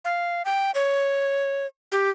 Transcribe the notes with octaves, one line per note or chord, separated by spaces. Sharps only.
F5
G5
C#5
G4